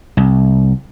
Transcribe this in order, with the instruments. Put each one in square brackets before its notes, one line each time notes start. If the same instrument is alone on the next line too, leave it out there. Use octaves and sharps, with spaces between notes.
[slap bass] C2